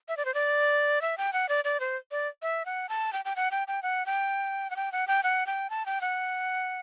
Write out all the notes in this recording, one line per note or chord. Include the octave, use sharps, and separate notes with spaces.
E5
D5
C5
D5
E5
G5
F#5
D5
D5
C5
D5
E5
F#5
A5
G5
G5
F#5
G5
G5
F#5
G5
F#5
G5
F#5
G5
F#5
G5
A5
G5
F#5